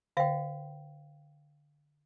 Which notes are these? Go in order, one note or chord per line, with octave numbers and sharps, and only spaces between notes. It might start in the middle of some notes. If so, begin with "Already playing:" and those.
D3 C5 F5 G5